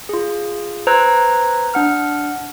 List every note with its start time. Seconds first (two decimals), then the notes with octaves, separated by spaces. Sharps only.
0.09 F4 G#4
0.87 B4 C5 A#5 E6 F#6 G#6
1.74 D4 F#5 F6